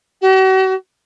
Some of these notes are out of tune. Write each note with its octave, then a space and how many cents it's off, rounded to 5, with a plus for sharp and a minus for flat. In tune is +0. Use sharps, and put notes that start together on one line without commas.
F#4 +45